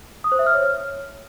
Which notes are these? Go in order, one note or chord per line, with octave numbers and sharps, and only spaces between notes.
D#6
C5
E5
F6
C#5